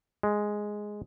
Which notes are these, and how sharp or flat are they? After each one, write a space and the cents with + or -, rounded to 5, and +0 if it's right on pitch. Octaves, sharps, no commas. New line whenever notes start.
G#3 +0